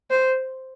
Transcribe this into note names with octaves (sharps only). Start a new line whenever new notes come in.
C5